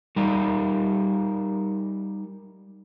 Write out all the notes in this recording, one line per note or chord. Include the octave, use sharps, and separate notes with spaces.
G3 D#4 A#4